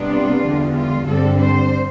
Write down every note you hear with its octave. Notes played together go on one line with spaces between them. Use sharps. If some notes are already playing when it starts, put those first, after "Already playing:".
Already playing: C3 G3 B3 D4
F4
E2 D3 G3
F4
G2 D3 G3 C4 A4
C5